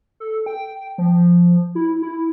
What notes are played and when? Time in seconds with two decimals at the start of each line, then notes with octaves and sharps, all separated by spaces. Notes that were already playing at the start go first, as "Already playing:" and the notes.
0.20 A4
0.46 G5
0.98 F3
1.75 E4
2.02 E4